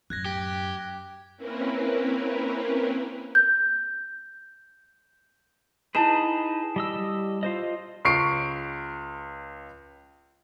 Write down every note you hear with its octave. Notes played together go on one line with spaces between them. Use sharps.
F#2 A2 F#6 G#6 A#6
G4
A#3 C4 C#4 E4 A#4 B4
G6
D#4 E4 G#4 B4 A5 E7
G3 D#5 E6
F4 C5 D#5
C#2 C#6 C7 D7